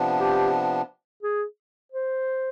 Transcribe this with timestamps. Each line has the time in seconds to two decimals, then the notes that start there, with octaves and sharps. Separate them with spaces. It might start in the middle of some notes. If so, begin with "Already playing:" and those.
Already playing: C3 F3 B3 D4
0.19 G4
1.23 G#4
1.92 C5